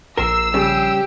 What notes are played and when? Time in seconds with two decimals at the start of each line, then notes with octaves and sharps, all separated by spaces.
0.17 A#1 A#4 E6 C7 E7
0.54 C#3 G3 G4